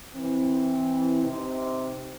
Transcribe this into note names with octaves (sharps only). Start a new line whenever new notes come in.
E3 C4
C3 D#4